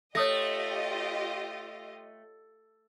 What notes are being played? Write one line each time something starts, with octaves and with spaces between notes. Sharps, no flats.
A3 F4 G4 C#5 D#5 D#6 A#6